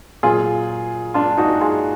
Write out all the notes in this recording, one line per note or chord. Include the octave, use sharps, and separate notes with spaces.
A#2 F#3 F4 G#4
D4 F4
D#4 F#4
F4 G#4